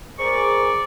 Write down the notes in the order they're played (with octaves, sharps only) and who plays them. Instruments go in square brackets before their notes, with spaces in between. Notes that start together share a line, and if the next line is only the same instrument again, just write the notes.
[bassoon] C4 [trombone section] G#4 A#4 [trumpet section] D5 [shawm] C#6